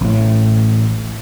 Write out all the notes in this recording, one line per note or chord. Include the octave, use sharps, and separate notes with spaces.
A1 A2